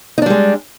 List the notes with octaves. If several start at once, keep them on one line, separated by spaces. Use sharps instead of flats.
G3 G#3 D4 D#4